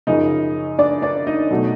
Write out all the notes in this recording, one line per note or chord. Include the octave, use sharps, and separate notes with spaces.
F#2 C#3 F3 D#4 D#5
D4 D5
D4 D5
D#4 D#5
B2 F#3 A3